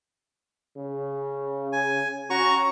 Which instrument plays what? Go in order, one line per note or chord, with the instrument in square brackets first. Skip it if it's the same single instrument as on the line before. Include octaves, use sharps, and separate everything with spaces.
[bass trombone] C#3
[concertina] G#5
[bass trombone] C#4 [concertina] F#4 A#5 C#6